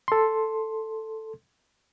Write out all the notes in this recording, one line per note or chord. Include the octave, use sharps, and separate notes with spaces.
A4 C6